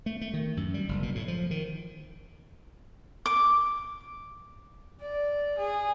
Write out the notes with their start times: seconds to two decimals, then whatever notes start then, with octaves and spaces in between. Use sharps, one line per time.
0.06 A3
0.21 A3
0.34 D#3
0.57 F#2
0.74 G3
0.89 F#1
1.03 B2
1.15 A2
1.28 F3
1.51 D#3
3.26 D6
5.02 D5
5.59 G#4